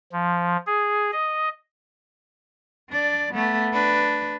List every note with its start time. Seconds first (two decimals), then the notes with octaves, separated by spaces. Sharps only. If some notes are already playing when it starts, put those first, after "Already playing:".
0.12 F3
0.67 G#4
1.12 D#5
2.90 D4 D5
3.33 A3 B3
3.72 D4 B4